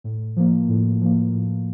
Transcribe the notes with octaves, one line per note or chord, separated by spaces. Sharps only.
A2
F3 A#3
A2
F3 A#3
A2